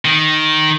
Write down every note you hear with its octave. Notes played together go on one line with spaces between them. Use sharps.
D#3